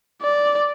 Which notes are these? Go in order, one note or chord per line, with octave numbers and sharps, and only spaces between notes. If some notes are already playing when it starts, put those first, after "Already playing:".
D5